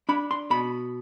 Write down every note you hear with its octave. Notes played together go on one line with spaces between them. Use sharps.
D4 B5
C6
B2 B5